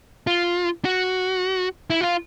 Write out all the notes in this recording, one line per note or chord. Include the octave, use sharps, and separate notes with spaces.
F4
F#4
E4
F4